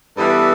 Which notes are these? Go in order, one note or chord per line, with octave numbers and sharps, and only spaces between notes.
G2 E3 G3 B3 D4 A4 B4